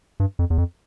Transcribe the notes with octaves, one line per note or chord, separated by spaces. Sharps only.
G2
F2
E2
F2